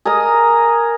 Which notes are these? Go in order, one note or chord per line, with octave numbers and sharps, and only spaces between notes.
G#4 A#4 D#5 A#5